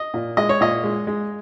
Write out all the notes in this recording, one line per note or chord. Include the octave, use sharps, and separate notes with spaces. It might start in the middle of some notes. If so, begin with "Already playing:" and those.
Already playing: D#5
A#2
G#3 D#5
C#5
A#2 D#5
G#3
G#3